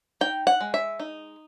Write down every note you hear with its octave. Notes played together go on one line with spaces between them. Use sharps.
D#4 G5
F#5
G#3
E5
D#4